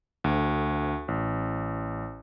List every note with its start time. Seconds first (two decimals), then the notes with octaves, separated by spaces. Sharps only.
0.24 D2
1.08 A1